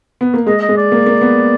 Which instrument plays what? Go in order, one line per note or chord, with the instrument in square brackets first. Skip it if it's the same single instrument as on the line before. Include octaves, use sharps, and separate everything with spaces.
[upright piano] B3
A#3
[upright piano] G#3 [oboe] D#5
[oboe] D#5
[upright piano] G#3
[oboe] D5
[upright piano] A#3
A#3
B3